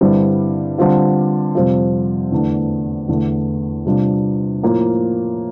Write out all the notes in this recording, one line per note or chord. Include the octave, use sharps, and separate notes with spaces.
G2 D3 G3 C4 E4
D3 G3 C4 F4
F2 C3 G3 C4 F4
E2 D3 A3 D4
E2 D3 A3
C3 G3 D4 F4
A2 F3 A#3 F4